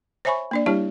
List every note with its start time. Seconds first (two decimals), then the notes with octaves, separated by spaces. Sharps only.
0.25 C5 C#5 E5 G#5 B5 C#6
0.51 A#3 D4 D5
0.66 G3 D4 E4 G4 C#5 A5